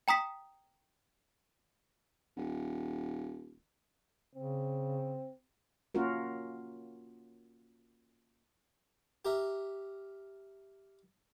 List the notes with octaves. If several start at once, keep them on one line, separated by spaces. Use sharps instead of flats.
G5 A#5 D#6 B6
D#1
C#3 C4
A#3 C#4 F4 F#4 A#4
G4 A#4 E5